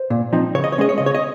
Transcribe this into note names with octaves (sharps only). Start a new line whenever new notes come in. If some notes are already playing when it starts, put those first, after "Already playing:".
Already playing: C5
A#2
F3 C4 D#4
C#3 C#5
D#5
C#5
G#3 C#4 D#5
C#5
C#3 D#5
C#5
D#5